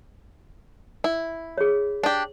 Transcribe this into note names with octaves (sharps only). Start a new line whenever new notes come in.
E4
G#4 C#5
D4 G4